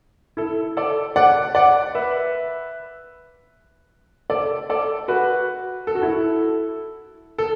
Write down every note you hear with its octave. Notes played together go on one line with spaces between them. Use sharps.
E4 A4
A4 D5
D5 F#5
D5 F#5
B4 E5
A4 D5
A4 D5
F#4 B4
A4
F#4
E4 A4
A4